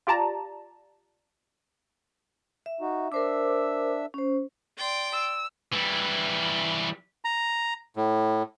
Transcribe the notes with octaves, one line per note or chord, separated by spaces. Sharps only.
F4 G4 D5 A5 A#5
E5
D#4 F#4
D4 A#4 C5 E5 D6 E6
C#4 C5
D5 G5 C6
E6
E3 G3
A#5
A2